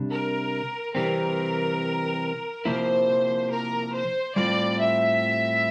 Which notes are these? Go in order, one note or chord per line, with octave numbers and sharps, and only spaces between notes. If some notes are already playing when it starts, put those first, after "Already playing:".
Already playing: C3 G3 D4
A#4
C3 E3 G3 C4 A#4
C3 F3 A#3 E4 C5
A#4
C5
A2 G3 C4 F4 D5
E5